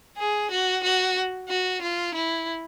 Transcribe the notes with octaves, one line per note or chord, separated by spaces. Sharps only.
G#4
F#4
F#4
F#4
F4
E4